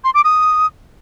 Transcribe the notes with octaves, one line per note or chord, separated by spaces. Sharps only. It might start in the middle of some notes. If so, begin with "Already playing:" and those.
C6
D6
D#6